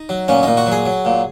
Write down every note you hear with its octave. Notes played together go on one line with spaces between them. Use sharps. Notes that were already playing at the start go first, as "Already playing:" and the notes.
Already playing: D#4
F#3
A#2 C#4
A#2 D#4
F#4
F#3
G#4
F#3
A#2